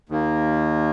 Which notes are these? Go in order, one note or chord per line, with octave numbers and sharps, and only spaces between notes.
D#2 D#3 A#3